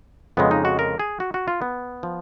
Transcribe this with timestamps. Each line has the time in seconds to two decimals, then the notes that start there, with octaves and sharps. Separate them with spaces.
0.37 F2 C#3 G#3 B3
0.51 D#4
0.65 F#4
0.79 A#4
0.99 G#4
1.20 F#4
1.34 F#4
1.48 F4
1.62 B3
2.03 F3